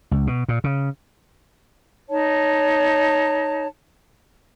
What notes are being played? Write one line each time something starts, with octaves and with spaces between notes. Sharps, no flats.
C#2
B2
A#2
C#3
D#4 C#5 A5